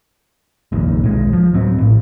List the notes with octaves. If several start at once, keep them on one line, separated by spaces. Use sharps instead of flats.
F1 A#1 D#2
D#1 B1 G#3
F3
D1 F#3 C4
A1 A2